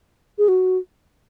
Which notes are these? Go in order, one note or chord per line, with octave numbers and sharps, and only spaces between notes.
G#4
F#4